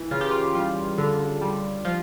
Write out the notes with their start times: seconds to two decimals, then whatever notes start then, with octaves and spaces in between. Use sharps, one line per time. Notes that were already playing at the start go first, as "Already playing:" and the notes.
Already playing: E3
0.11 C#3 F4
0.21 G4
0.31 F4
0.55 G3 F4
0.98 D3 F4
1.41 G3
1.85 F3 F4